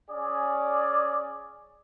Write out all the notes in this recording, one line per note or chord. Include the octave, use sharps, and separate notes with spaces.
C#4 G#4 D5